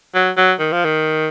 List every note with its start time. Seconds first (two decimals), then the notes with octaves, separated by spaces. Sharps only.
0.15 F#3
0.37 F#3
0.59 D#3
0.72 F3
0.84 D#3